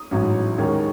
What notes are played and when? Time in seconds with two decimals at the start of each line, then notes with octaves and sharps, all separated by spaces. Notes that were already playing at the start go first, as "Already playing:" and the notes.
Already playing: D#6
0.11 A1 G#2 F#3 C#4
0.58 D#2 D#3 G#3 C#4